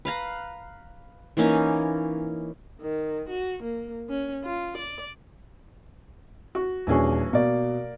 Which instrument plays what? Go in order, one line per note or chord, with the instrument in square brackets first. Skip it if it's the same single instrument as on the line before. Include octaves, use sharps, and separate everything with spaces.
[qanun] B4 F5 A#5
E3 A#3 C#4 D#4
[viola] D#3
F#4
A#3
C#4
F4
D5
[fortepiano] F#4
[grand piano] D#1 D4 G#4 [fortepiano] E3 C#4 F#4
[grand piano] B2 [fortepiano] A#3 D5